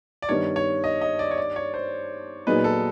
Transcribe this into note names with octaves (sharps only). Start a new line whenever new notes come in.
D5
G2 D#3 G3 B3 D#4 C#5
C#5
D#5
D#5
D5
C#5
D5
C#5
C5
A#2 F#3 B3 D#4 G#4 B4
A4